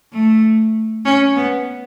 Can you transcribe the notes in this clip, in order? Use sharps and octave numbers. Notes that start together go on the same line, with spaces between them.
A3
C#4
B3